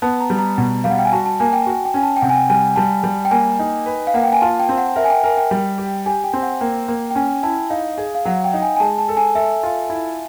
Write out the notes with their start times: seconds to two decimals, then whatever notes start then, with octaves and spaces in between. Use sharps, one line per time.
0.02 B3 A5
0.21 A#5
0.30 G3
0.39 A#5
0.58 B2
0.84 G3 F5
0.90 F#5
0.98 G5
1.05 G#5
1.12 F#4 A5
1.26 A5
1.40 A#3 G#5
1.53 G5
1.66 F#4
1.85 G5
1.94 C#4 G#5
2.03 A5
2.17 G5
2.22 C3 F#5
2.30 G#5
2.36 G5
2.50 G3 G#5
2.76 G3 A5
3.04 G3
3.25 G5
3.31 A#3 G#5
3.59 D#4
3.86 B4
4.07 F5
4.14 A#3 F#5
4.24 G5
4.33 G#5
4.41 F4 A5
4.60 G5
4.69 C4
4.78 F#5
4.96 A#4 E5
5.04 G#5
5.10 G5
5.23 A#4 G#5
5.37 G5
5.51 G3
5.78 G4
6.06 G4 G#5
6.24 G5
6.33 C4
6.42 F#5
6.61 A#3 G5
6.88 A#3
7.11 G5
7.15 C#4 G#5
7.43 E4 A5
7.70 D#4 F5
7.98 G#4
8.15 F5
8.25 F#3 F#5
8.44 G5
8.54 D#4
8.62 G#5
8.76 G#5
8.80 G#3 A5
8.99 A5
9.08 A4
9.17 G#5
9.35 A4 E5
9.63 F4
9.90 E4